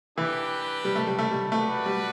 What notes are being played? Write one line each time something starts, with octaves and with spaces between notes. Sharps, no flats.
E3 D4 G4 B4
G3
A3
G3
A3
G3
A3 F#4 B4 D5
G3